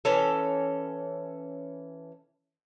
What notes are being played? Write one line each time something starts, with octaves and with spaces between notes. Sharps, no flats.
E3 C#4 A4